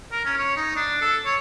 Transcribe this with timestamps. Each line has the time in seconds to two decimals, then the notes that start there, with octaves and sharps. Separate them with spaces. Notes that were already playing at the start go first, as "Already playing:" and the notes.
0.12 A#4
0.25 C#4
0.38 C#5
0.56 D#4
0.76 D4
1.02 A4
1.25 C#5